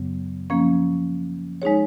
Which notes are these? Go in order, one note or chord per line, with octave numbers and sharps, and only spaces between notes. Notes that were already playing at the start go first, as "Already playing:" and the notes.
Already playing: F#2 C#3 F#3 B3
F3 A#3 C#4
G#3 D#4 G#4 C#5